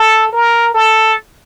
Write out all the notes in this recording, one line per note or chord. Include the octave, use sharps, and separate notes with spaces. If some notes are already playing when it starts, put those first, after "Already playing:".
Already playing: A4
A#4
A4